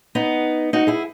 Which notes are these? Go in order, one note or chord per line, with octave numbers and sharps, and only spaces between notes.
B3 D#4
D#4 F#4
E4 G#4